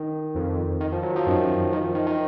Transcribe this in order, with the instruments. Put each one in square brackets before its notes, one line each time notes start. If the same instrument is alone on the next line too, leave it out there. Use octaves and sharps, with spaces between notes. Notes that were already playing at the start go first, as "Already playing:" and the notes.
Already playing: [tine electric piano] D#3
[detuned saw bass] F2
[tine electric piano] D#3
F3
F#3
F3
[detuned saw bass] F#2 [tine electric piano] D#3
[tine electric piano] D#3
F3
D#3
D#3